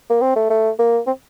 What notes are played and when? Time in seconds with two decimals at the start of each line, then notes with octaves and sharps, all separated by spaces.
0.10 A#3
0.21 C4
0.36 A3
0.50 A3
0.79 A#3
1.07 C4